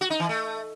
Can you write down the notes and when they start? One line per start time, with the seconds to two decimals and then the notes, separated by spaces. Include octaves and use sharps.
0.01 F#4
0.10 D#4
0.20 E3
0.29 A3